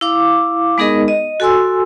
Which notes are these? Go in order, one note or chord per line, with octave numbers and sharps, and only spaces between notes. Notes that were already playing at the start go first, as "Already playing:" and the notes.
E4 F5 D6
G#3 B3 D#4 G#4 A#4 D#5
D#5
F#4 A4 G#5 C6 E6